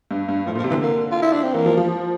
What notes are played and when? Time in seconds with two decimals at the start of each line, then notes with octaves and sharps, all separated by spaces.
0.11 G2
0.29 G2
0.46 A2 F3
0.55 A#2
0.58 F3
0.64 C3
0.70 E3
0.73 D3
0.82 A#3
1.12 F4
1.22 E4
1.33 D4
1.43 C4
1.54 E3 A#3
1.66 F3
1.77 F3